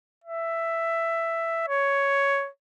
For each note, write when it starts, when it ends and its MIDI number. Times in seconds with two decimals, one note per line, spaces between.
0.24 1.66 76
1.68 2.49 73